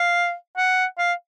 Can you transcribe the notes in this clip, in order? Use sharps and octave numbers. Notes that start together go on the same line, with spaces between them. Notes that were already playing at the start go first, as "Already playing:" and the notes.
Already playing: F5
F#5
F5